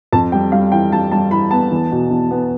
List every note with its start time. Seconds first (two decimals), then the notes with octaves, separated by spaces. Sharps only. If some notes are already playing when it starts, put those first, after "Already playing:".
0.12 F2 A5
0.32 G3 G5
0.52 G3 F5
0.72 E3 G5
0.92 G3 A5
1.12 G3 A5
1.31 E3 B5
1.51 B3 A5
1.71 E2
1.92 B2
2.10 E2
2.31 B3